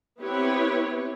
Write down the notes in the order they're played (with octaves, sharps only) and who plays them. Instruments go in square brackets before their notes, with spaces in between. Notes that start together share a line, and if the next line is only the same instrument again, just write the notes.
[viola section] B3 C4 E4 G4 B4 C#5